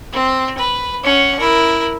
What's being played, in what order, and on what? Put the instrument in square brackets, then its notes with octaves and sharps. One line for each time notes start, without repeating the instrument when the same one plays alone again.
[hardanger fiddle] C4
B4
C#4 F#5
E4 A#4